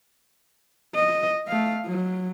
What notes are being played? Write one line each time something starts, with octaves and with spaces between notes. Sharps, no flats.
D#5
A3 F5
F#3